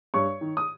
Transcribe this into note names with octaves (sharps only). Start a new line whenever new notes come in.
G2 C#5 C#6
D#3
D#6